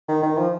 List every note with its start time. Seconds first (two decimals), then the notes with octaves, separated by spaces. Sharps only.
0.08 D#3
0.23 D#3
0.38 F3